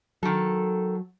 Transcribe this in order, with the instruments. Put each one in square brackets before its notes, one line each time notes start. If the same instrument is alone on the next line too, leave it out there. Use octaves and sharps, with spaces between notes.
[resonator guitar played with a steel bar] D#3 A4 [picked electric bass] F#3